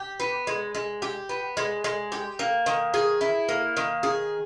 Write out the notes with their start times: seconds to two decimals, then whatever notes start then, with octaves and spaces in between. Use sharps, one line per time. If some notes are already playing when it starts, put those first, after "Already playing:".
Already playing: G4
0.20 B3
0.47 G#3
0.75 G#3
1.02 G4
1.29 B3
1.57 G#3
1.84 G#3
2.12 G4
2.39 A#3
2.66 D#3
2.94 G#4
3.21 E4
3.49 A#3
3.77 D#3
4.03 G#4